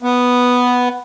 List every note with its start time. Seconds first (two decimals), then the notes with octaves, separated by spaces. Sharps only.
0.02 B3